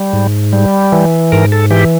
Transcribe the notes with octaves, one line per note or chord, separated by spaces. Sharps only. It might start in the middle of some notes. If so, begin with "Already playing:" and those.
Already playing: G3
G#2
G3
E3
G#2 A#4
A4
E3 G4